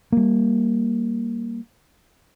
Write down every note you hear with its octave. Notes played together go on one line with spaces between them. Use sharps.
G3 A#3